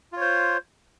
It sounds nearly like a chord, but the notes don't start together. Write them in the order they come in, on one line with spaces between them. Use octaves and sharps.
F4 C#5 C5